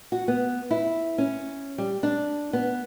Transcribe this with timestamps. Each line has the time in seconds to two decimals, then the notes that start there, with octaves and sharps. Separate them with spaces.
0.12 F#4
0.28 B3
0.71 E4
1.18 C#4
1.78 G3
2.03 D4
2.53 B3